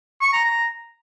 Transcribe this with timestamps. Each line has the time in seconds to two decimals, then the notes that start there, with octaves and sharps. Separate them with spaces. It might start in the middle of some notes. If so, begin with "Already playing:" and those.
0.21 C#6
0.33 A#5
0.44 A#5